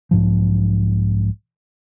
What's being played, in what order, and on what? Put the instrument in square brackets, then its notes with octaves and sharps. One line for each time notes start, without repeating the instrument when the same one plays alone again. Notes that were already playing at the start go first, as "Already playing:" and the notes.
[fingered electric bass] B1 G#2 F3